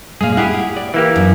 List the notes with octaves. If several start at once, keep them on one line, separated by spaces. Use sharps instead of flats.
A#2 G#3 G#4 F5
E4 G4 G#4 F#5
D5
E3 A#3 G4
F#2